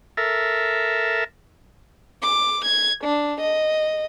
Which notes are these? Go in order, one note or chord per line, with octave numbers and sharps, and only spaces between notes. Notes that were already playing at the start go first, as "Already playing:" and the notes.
A4 A#4 E5
D6
G#6
D4
D#5